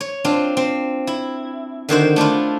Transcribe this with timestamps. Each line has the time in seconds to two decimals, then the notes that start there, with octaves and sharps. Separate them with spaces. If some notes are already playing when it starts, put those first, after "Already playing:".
0.01 C#5
0.25 C4 D4 F4
0.57 C4
1.07 E4
1.89 D3 D#3 F#4 C5
2.16 A3 D4 E4 F4